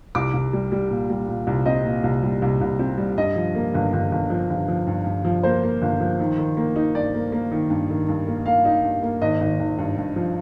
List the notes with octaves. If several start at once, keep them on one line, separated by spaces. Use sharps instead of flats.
C2 D6
C2
G3
G3
A#2
G3
A#2
C2
C4 D#5
A#2
C2
G3
C2
C2
C4
G3
G2 D#5
F3
A#3
G1
G1
G1
F3
G1
F3
G2
G2
F3
A#3 C5
A#3
G1
F3
D#3
D#3
A#3
D#4
G2 D5
A#3
A#3
D#3
G2
D#3
G2
A#3
A#3 F5
D#4
G2
A#3
G#1 D#5
G#1
G#1
G2
G2
F3